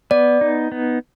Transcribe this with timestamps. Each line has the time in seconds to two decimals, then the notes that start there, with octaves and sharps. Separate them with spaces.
0.11 B3 D5
0.41 D#4
0.72 B3